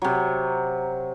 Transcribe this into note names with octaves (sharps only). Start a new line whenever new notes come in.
C3 F#3